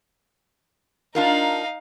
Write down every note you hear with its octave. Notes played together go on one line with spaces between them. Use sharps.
D4 D#4 F4 A#4 F5